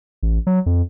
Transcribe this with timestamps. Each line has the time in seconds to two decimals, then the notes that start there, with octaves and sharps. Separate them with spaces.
0.23 A1
0.47 F#3
0.66 F2